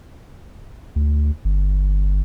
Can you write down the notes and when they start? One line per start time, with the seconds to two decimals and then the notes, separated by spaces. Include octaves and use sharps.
0.96 D2
1.45 G1